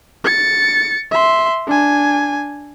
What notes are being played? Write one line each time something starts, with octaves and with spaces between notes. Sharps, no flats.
A6 C#7
E5 C6
D4 G#5